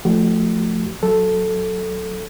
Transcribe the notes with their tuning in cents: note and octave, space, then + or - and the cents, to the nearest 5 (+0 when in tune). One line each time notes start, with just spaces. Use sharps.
F3 +0 A3 +0 F#4 +45
F#3 +0 A4 +0